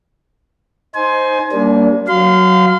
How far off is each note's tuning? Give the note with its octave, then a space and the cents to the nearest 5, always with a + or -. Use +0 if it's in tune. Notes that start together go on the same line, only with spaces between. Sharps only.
D#4 +0 C5 +0 G#5 +25
G3 +0 A#3 +0 D4 -30
F#3 +0 F5 +0 C6 -35